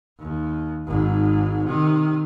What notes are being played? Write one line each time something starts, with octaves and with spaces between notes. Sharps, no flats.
D#2
G#1 G#2
C3 D#3